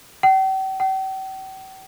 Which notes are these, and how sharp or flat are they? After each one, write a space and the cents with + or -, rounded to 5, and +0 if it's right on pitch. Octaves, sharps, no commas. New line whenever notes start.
G5 -45
G5 -45